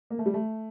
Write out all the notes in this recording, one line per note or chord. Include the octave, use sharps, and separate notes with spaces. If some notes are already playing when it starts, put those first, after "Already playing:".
A#3
A3
G3
A3